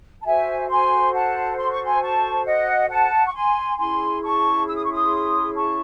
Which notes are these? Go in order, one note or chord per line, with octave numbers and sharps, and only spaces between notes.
A5
F#4 A4 C5 E5 G#5
G#5 C6
F#5 A5
C6
C#6
G#5 C6
A5 C#6
D#5 F#5
F#5 A5
C#6
G#5 C6
C#4 E4 G#4 G#5 C6
A5 C#6
E6
D#6
C#6
C6 D#6
A5 C#6